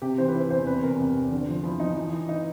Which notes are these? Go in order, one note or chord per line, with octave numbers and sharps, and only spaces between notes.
C3 G4
E3 C5
B4
E3 C5
E2 C5
C3 B4
E2 A#4
C3
E2
D3
F3
F3 E4
F3 D#4
E3
E3
D#4